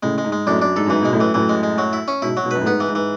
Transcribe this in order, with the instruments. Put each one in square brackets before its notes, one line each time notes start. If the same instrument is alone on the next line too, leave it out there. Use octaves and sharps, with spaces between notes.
[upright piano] A2 C#3 [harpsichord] G#3
[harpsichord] G#3
[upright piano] G#2
[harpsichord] G#3
[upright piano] F#2 A2 [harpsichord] D4
[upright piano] F#2 [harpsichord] D4
[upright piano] G#2 [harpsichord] A4
[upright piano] F#2
[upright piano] G#2 [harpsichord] E3
[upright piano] B2 [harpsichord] G#3
[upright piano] F#2 A2
[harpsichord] E3
[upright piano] F#2 A2 [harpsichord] E3
[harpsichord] G#3
G#3
F#3
E4
C#4
[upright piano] G#2 B2 [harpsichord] E4
[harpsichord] F#3
[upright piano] G#2 B2
[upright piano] F#2 [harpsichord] B4
[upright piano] A2
[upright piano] G#2 [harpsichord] B3
[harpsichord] E3
[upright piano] G#2
[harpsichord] E3